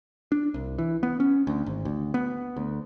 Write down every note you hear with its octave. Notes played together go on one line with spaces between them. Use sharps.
D4
C2
E3
B3
C#4
D2
G#1
D2
B3
D2